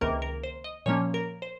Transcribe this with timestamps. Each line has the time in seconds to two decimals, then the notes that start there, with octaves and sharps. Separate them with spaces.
0.01 C#2 C3 D#3 A#3 A#4
0.22 A#4
0.44 C5
0.64 D#5
0.86 A#2 F3 A#3 C#4 C#5
1.14 A#4
1.42 C5